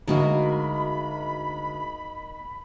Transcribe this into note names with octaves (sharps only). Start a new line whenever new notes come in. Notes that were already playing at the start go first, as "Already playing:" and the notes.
D2 G#3 A#3 D#4 F#4 A#4 A#5 B5